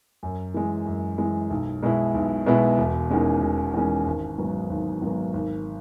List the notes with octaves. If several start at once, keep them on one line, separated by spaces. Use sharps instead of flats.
F#2
E3 G#3
F#2
E3 G#3
B1
B2 G#3 B3 E4
B1
B2 G#3 B3 E4
E1
E2 D#3 G#3 C#4
E1
E2 D#3 G#3 C#4
G#1
G#2 F#3 B3
G#1
G#2 F#3 B3
G#1